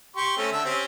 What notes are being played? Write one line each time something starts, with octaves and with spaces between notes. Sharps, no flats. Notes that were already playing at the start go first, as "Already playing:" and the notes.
G4 C6 C#6
A3 C4 C#4
D3 E5
C4 C#4 G4